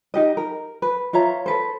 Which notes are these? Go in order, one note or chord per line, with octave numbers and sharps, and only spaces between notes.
D#4 G4 D#5
A#4
B4
F4 C#5 E5 A#5
A4 B4 C5